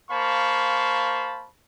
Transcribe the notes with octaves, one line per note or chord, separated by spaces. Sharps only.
A#3 C5 F5 A5 B5 C#6